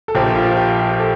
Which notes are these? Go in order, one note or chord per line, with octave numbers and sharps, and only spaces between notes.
A4
A#1 A#2 F3 G4
F4
G4
G4
A4